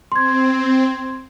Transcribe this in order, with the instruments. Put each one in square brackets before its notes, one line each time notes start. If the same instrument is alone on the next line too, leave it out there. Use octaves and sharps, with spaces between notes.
[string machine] C4 [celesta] C6 G#6